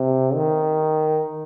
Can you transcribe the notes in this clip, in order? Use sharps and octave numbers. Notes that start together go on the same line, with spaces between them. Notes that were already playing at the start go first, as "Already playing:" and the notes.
Already playing: C3
D#3